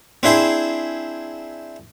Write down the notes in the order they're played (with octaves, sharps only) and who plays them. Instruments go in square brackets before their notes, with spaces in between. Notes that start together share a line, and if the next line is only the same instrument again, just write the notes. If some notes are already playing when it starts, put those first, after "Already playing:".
[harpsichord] C4 D4 E4 G#4 C5